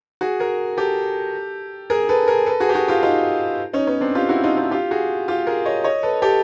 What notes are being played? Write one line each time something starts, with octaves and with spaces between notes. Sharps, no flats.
F#4 G#4
G#4 A#4
G4 A4
G#4 A#4
A4 B4
G#4 A#4
A4 B4
F#4 G#4
G4
F#4 G#4
F4 G4
D#4 F4
C#4 D#4
B3 C#4
C4 D4
F4 G4
E4 F#4
D#4 F4
D#4 F4
F4 G4
F#4 G#4
F4 G4
G#4 A#4
C#5 D#5
C#5 D#5
A4 B4
G4 A4